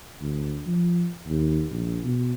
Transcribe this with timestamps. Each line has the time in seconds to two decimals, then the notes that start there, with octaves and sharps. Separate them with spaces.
0.21 D2
0.66 F3
1.28 D#2
1.71 A#1
2.04 B2